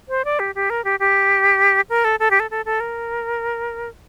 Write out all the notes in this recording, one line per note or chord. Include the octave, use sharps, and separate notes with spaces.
C5
D5
G4
G4
A#4
G4
G4
A#4
A4
A4
G4
A4
A4
A4
A#4